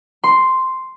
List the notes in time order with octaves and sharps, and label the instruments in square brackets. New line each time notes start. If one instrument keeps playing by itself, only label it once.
[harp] C6